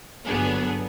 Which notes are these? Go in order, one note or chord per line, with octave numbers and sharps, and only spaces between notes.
G1 F#3 B3 D4 G#4